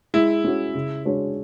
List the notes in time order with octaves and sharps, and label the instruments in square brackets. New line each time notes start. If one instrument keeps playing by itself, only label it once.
[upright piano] G#3 [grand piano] E4
[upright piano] C#4 F#4 C#5
C#3
G#3 D4 F#4 C#5